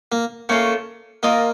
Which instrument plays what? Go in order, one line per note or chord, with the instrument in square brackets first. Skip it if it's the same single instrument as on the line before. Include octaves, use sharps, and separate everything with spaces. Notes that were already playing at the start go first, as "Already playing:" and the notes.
[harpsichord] A#3
[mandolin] A3 C#4 F4 A4 [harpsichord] A#3
[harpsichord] A#3 [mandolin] F4 A#4 D#5